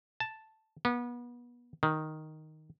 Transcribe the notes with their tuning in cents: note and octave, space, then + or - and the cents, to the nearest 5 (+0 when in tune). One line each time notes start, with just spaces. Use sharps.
A5 +0
B3 -30
D#3 +0